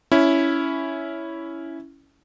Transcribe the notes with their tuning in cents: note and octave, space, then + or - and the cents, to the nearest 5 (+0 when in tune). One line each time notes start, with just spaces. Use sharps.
C#4 +10 E4 +0